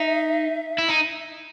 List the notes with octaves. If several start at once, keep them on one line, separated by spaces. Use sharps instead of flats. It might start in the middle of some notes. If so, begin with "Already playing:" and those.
Already playing: D#4 E5
E4
D#4